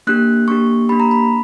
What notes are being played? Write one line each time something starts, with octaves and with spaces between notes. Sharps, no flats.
A#3 D4 G4 F#6
A#3 D4 G4 C#6
A#3 D4 G4 B5
A#5
B5